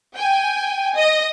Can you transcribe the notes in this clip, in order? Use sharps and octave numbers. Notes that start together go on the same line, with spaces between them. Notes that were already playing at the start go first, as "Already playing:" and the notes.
G5 G#5
D#5